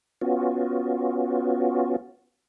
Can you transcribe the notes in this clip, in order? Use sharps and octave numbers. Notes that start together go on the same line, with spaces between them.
B3 C#4 F4 F#4